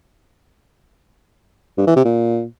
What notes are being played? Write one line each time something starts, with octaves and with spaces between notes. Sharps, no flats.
G2
E3
C3
A#2